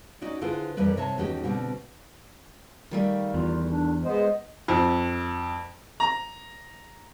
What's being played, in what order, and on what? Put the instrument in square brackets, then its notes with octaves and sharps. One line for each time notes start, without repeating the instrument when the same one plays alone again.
[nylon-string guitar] C#4 D#4 F#4 D5
D3 E4 F4 G#4 B4 C5
F2 E3 G3 A#4 B4 D5
C3 C#5 E5 A5
E2 D#3 C#4 F#4 G4
B2 D3 G3 C4
[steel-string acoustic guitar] D#3 G3 A3 [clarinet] F5
[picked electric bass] E2 [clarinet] F4
[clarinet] D4
[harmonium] G#3 B3 C5 [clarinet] D#5
[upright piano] F2
A#5